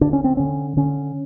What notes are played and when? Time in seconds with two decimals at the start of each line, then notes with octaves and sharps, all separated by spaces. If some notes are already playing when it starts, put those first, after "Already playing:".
0.01 D3 D4
0.13 C#4
0.24 C4
0.37 D3 C#4
0.77 D3 C#4